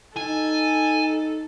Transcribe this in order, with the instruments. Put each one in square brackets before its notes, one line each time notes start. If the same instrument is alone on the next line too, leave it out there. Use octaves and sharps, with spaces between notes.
[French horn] D#4 [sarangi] A4 [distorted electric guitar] G#5